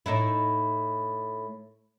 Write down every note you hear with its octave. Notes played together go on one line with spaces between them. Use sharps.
A2 D#4 E4